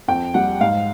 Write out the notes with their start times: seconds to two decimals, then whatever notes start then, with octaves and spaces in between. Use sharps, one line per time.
0.08 F2 G5
0.34 G3 F#5
0.61 G#2 F5